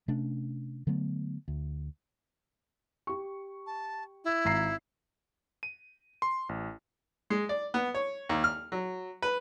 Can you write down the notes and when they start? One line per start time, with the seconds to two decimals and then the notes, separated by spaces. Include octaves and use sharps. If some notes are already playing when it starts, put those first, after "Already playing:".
0.08 C3 A3 C#4 D4
0.87 D3 F#3 A3 B3
1.48 D2
3.07 G4 C#6
3.66 A5
4.24 E4
4.45 G#1 A#5 C7
5.63 D#7
6.22 C6
6.49 A1
7.30 G#3
7.49 D5
7.74 B3
7.94 C#5
8.29 D#2
8.44 F6
8.72 F#3
9.22 B4